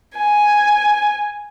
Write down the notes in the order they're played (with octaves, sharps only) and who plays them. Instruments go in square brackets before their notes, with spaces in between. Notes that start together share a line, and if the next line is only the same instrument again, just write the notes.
[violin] G#5